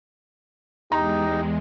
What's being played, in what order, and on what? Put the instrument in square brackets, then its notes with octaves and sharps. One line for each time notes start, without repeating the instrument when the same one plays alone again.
[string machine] E2 G#3 [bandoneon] D#4 [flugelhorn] G4 [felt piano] A#5